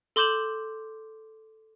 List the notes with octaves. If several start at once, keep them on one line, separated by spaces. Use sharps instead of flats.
A4 C6 D6 G6 E7 F#7